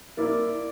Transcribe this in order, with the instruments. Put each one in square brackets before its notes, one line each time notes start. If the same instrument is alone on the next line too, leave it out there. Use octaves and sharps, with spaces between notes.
[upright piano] A#3 E4 A#4 [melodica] D5